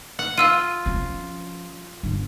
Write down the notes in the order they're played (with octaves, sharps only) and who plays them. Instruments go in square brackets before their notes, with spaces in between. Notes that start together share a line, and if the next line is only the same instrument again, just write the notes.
[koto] F#5
[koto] F4 [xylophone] F5 E6 D#7
[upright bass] F3 C#4
G1